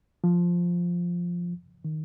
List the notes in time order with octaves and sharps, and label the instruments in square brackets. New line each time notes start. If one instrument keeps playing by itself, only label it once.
[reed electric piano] F3
D#3